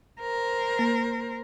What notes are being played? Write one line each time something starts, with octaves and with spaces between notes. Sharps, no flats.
A#4 C5
A#3